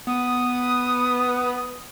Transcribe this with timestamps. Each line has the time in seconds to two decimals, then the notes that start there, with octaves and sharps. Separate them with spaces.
0.07 B3 D#6